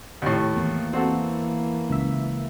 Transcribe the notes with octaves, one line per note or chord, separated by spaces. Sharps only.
D#2 A2
E2 E3 A#3
C4 F#4 A4
C#2 E5